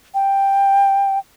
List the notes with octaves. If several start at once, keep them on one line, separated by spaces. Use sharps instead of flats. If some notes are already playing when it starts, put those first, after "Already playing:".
G5